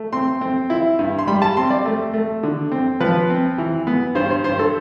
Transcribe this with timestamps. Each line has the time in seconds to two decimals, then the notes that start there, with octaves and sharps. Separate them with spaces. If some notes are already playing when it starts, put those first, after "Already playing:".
Already playing: A3
0.13 C4 C6
0.41 C4
0.70 E4
0.99 G2
1.19 C6
1.27 G3 B5
1.42 A5
1.57 C4 C6
1.71 D5
1.85 A3
2.14 A3
2.43 D3
2.72 C4
3.00 F3 B4
3.30 C4
3.58 E3
3.87 B3
4.15 G2 C5
4.30 C5
4.44 G2 C5
4.59 A4